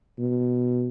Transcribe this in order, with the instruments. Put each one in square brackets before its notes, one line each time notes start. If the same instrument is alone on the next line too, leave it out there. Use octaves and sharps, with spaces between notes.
[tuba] B2